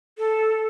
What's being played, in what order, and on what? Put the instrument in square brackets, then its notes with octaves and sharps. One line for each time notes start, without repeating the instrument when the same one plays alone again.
[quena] A4